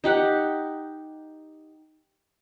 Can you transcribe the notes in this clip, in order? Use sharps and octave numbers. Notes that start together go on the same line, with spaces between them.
D#4 G4 F#5